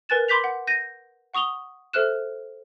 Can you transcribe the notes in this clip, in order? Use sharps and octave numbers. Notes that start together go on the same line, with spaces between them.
A#4 B4 G#5 F#6 A6 E7
B5 C6 D6 G6 B6 F7
F#5
G6 A#6 D#7
F#5 C#6 D#6 F7 G7
A4 C5 E5 F6 F#6 E7